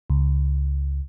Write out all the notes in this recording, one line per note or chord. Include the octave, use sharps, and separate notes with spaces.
C#2